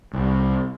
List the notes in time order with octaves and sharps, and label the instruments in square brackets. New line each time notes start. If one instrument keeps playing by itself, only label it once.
[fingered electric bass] C2